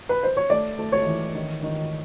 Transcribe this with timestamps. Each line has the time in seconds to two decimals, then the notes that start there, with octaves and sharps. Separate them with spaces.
0.09 B4
0.23 C5
0.37 C#5
0.50 A3 D5
0.79 A3
0.92 C#5
1.06 E3
1.35 D#3
1.63 D#3